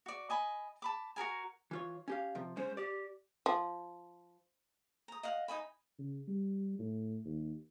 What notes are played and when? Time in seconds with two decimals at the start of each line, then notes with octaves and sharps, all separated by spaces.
0.06 F#4 D5
0.30 D#5 G#5 B5
0.82 A5 B5 D6
1.16 F#4 G#4 A#4 G#5
1.71 E3 F4 C#5
2.08 C#4 G4 F5
2.35 C3 F3
2.57 G#3 C#4 C5
2.77 G4 D5
3.46 F3
5.08 A#5 D#6
5.23 D#5 F5 F#5
5.48 D#4 D#5 G#5 B5
5.99 C#3
6.28 G3
6.79 A2
7.25 D#2